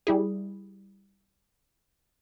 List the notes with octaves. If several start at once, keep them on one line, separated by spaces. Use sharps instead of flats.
G3 E4 G#4